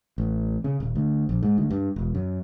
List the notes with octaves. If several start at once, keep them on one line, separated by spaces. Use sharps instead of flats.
A1
C#3
D#1
D2
A#1
G#2
D2
G2
E1
F#2